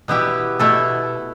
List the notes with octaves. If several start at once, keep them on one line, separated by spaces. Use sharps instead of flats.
B2 B3 E4 G4
B2 A3 E4 A4